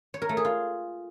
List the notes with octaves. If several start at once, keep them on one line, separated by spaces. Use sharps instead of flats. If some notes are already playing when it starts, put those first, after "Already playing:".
C#5
A#4
A3
G#4
F4